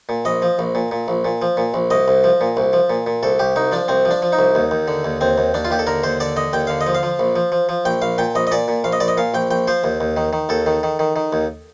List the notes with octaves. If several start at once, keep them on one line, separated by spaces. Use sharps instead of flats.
A#2
A#1 D#5
F3
A#1
A#2
A#2
A#1
A#2
F3
A#2
A#1
C2 D#5
C2
F3
A#2
C2
F3
A#2
A#2
C2 A4
C2 G4
C2 D#4
F3 D4
C2 C4
F3
D4
F3
D#4
C2
D#2
D#2
D3
D#2
D#2 C4
D#2
D#2 D4
F4
D#2 G4
A4
D3 A#4
D#2 C5
D3 D5
D3 D#5
D#2 G5
D3 F5
D#5
F3
F5
F3
A#1
F3
F3
F3
A#1 G5
A#1 F5
A#2 G5
A#1 D#5
D#5
A#2 D5
A#2
A#1 F5
D#5
A#1 D5
D#5
A#2 F5
A#1 G5
A#1 G5
F3 C5
D#2
D#2
D#3
D#3
D#2 A4
D#3
D#3
D#3
D#3
D#2